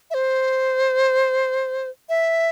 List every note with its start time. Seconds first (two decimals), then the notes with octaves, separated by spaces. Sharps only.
0.10 E5
0.14 C5
2.09 E5